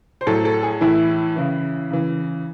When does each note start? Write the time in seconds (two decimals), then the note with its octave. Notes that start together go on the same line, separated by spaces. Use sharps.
0.21 C5
0.27 A2 F#3 A4
0.45 A4
0.63 G#4
0.81 A2 E3 E4
1.36 C#3 E3
1.91 C#3 E3